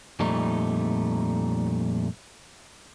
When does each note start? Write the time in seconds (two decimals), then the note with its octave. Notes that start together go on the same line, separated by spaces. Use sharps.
0.20 F2 A#2 G3 A3 D#4